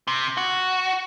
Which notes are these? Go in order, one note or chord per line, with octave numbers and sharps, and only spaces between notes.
C3
F#4